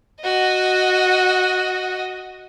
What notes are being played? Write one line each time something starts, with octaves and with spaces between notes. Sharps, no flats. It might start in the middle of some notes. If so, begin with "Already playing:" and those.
F#4 D#5